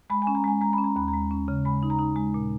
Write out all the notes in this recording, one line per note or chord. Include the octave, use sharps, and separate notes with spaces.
G#3 B5
G#5
C#4
A#5
G#3 G#5
G#3 A#5
B5
C#4
A#5
D#2 B5
A#5
G#3
C#4
C#3
G#3 B5
D#4
A#5
D#4
G#3
A#2